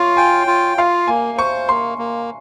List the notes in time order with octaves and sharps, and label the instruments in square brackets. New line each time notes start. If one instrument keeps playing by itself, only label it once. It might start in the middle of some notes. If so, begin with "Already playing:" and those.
Already playing: [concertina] F4 [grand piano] C#5 F5
[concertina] G5 [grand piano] G#5
[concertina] F4
[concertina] F4 [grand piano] F5
[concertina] A#3 [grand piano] G#5
[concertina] C5 [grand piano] C#6
[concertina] A#3 [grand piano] C6
[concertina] A#3